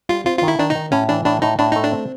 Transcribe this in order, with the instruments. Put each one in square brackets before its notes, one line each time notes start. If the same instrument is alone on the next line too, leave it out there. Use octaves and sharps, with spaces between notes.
[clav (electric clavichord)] G3 [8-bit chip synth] F4
[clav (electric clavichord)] C4 [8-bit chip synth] F4
[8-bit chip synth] F4
[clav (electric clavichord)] D#3 [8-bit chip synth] E4
[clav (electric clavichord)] D#3 [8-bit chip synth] D4
[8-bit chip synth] D#4
[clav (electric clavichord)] D#3
[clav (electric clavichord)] A2 [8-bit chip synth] C#4
[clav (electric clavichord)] E3 [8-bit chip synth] D4
[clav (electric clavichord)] A2 [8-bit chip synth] D4
[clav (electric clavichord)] A2 [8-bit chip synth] D#4
[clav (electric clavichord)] A2 [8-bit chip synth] D4
[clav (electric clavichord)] A3 [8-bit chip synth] D#4
[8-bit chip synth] D4
[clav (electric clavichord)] C4